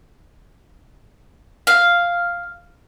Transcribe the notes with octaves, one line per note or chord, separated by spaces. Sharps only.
F5